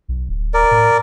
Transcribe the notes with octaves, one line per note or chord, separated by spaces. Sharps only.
B1
D1
A#4 D5
A2